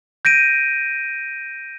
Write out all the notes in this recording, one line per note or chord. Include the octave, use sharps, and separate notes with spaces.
G6 A#6 D7 D#7